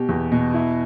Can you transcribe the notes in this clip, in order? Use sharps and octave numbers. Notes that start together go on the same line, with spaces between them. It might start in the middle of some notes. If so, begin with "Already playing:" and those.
Already playing: B2 G4
E2
B2
E4